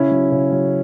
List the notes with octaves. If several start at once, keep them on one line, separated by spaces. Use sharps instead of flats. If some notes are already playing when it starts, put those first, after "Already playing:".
Already playing: C#3 C#4 E4
F#3
C#3
F#3